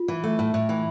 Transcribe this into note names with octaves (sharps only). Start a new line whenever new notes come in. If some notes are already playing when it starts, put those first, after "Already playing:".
Already playing: F4
E3
A3
A2
A2
E3